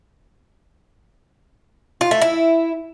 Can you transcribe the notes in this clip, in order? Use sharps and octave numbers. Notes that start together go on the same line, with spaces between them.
F4
A3
E4